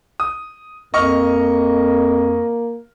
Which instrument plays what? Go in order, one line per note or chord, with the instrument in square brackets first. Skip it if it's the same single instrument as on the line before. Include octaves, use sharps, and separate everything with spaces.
[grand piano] D#6
[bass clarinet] F2 [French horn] A#3 [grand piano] D#5 C#6 F6